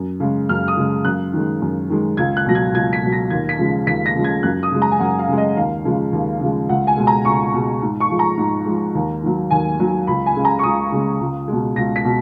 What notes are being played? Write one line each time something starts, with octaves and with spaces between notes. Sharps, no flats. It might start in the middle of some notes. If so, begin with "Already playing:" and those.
Already playing: F#2
C#3 G#3
F#2 F6
D#6
C#3 G#3
F#2 F#6
D#3 G#3
F#2
D#3 G#3
C#2 G#6
F#6
B2 F#3 A#6
G#6
C#2 G#6
B6
B2 F#3
A#6
D#2 G#6
B6
C#3 F3 G#3
D#2 B6
A#6
C#3 F3 G#3
G#6
F#2 F#6
D#6
C#3 G#3
A#5
G#5
F#2 F#5
F5
C#3 G#3
D#5
D#2 F5
C#3 F3 G#3
D#2
C#3 F3 G#3
C#2 F#5
G#5
B2 G#3
A#5
C#2 C#6
B2 G#3
G#2
C#6
F3 G#3
A#5
G#2
F3 G#3
D#2
D#3 F#3
D#2 G#5
D#3 F#3
C#2 B5
G#5
C#3 G#3
A#5
C#6
C#2 D#6
C#3 G#3
C#2
B2 G#3
C#2 A#6
B6
B2